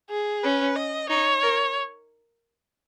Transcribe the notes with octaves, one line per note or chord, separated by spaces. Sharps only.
G#4
C#4 B4
D#5
D#4 C#5
A#4